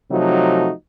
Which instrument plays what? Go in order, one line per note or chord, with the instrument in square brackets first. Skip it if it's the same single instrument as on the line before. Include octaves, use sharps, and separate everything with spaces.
[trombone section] C3 F3 F#3 A3 D#4 F#4